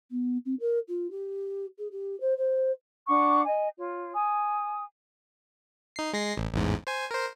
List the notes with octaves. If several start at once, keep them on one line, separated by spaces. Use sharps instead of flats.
B3
C4
A#4
F4
G4
G#4
G4
C5
C5
D4 F#5 C#6 D6
D#5 G#5
F4 C#5
G#5 D#6
D#4 C7
G#3 A#6 C7
A1
A1 E2 G#2
C5 G#5
A#4 C5